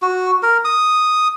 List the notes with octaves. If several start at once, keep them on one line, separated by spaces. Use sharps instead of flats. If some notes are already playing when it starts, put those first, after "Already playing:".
F#4
A#4
D#6